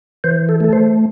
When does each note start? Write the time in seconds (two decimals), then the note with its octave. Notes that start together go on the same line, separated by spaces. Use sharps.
0.24 E3 C5
0.49 A4
0.60 A3 A4
0.73 C5